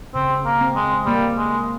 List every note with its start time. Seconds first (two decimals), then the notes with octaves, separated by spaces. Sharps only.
0.15 C#3 C4
0.46 A#3
0.61 C4
0.76 G#3
1.06 G3 A#3
1.37 G#3